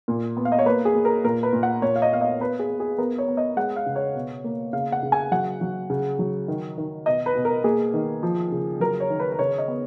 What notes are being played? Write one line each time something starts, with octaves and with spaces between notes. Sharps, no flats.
A#2
B3
F5
D#5
C#5
A#3 B4
G#4
A#3
A#4
A#2 A#4
B4
A#2
F#5
A#2 C#5
F5
D#5
B3 F5
D#5
B3 B4
G#4
B3
G#4
B3 A#4
C#5
B3
D#5
G#3 F#5
F5
C#3
C#5
B2
A#3
C#3 F5
F#5
C#3
G#5
F#3 F#5
F#3
C#3
F#3
D#3
D#3
B2 D#5
B4
B2
A#4
A#3 G#4
D#3
F3
C#3
F#3 A#4
C#5
D#3
B4
B4
C#3 C#5
D#5
B3